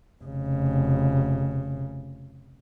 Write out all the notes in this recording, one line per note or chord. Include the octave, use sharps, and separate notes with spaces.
F1 C#3